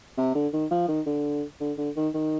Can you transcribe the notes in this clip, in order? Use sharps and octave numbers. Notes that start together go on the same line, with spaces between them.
C3
D3
D#3
F3
D#3
D3
D3
D3
D#3
D#3